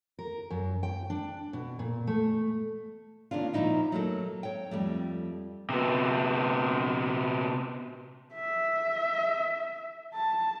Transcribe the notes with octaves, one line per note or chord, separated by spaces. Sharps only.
A#4
F#2
G5
D4
B2
A#2
A3
D#3 A#3 C#4 D4 F4
A#2 D#3 F3 D#4 E4
F#3 A3 A#3 A4
C#5 G5
F2 G3 A3
C3 B3
E5
A5